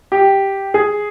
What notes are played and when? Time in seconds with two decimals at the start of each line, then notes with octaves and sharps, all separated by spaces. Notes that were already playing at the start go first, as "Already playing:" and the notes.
0.12 G4
0.74 G#4